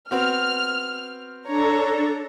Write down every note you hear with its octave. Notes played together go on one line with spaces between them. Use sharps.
B3 C4 F#4 F6
D4 A4 C#5 A#5